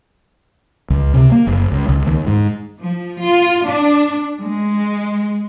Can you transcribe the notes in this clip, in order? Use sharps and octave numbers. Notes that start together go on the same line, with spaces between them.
C#2
C3
A#3
F#1
C#2
C#2
D#2
G#2
F3
F4
D4
G#3